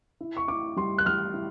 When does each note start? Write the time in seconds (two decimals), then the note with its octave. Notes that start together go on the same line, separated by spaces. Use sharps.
0.21 E4
0.37 C#6
0.48 E4 D6
0.76 G3 C6
0.98 F#6
1.06 G3 F6
1.34 E4